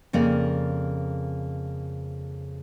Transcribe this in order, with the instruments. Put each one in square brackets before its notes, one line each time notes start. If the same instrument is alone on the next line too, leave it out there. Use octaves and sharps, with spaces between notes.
[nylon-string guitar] F2 C#3 A#3 A#4 D5